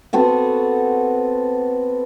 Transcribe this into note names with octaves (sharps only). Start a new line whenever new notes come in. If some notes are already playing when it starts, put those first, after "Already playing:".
B3 C4 F#4 A4